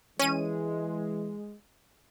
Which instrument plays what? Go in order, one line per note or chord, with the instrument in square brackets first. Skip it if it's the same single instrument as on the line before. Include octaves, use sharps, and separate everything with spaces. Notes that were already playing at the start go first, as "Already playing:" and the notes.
[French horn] E3 [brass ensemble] G#3 [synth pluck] C#4 D#7